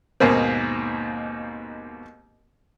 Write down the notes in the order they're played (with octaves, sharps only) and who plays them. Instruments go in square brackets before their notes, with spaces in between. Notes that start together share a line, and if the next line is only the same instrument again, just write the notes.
[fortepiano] D#2 G#2 B2 A#3 C4